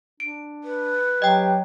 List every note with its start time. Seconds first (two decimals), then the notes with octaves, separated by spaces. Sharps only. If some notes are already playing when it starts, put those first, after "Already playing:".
0.20 D4 D7
0.64 B4
1.22 F#3 G4 D#5 G5